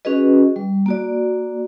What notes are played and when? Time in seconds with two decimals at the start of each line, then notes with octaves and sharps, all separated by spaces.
0.05 C#4 F#4 G#4 B4 D#5
0.56 G3
0.86 A#3 F#4 D5